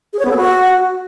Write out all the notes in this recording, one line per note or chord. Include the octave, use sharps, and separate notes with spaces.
G#4
C#5
B3
A4
F#4